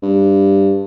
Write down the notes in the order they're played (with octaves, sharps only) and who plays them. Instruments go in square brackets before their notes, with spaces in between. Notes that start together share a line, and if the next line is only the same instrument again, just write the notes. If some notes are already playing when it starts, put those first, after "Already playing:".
[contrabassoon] G2